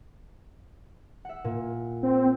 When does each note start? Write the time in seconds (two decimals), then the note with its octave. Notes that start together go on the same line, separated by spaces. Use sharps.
1.25 E5 F#5
1.44 A#2
2.03 C4